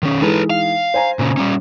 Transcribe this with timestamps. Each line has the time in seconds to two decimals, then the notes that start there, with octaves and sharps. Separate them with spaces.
0.03 D#3 C#4
0.22 E3 G#3 D#4 A4 B4
0.50 F5
0.94 C5 G#5 A#5
1.19 A#2 C#3
1.37 G3 C#4